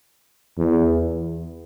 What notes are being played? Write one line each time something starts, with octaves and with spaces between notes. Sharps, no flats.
E2